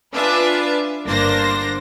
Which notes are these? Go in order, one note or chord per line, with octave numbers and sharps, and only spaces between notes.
D4 F4 B4 E5 G#5 A5
G1 A#3 D4 C5 A#6